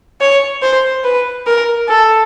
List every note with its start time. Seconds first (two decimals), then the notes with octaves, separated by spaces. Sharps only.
0.21 C#5
0.62 C5
1.04 B4
1.47 A#4
1.88 A4